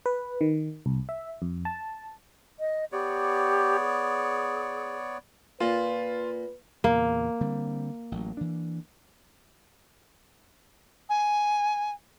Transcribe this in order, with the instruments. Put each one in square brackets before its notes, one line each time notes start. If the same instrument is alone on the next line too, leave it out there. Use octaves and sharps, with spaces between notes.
[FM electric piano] B4
D#3
C2
E5
F2
A5
[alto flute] D#5
[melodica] B3 C#5 D5 [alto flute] G4
[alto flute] G#4
[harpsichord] A#2 [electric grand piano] F4 [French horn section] B4
[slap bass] E2 A#2 C#3 [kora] A#3
[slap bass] D3 G3 C4
A1 F#3
E3 D4
[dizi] G#5